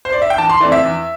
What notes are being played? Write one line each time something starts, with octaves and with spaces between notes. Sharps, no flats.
C5
D5
E5
G5
E2 A5
C6
E3 A3 C4 D5
E5
E2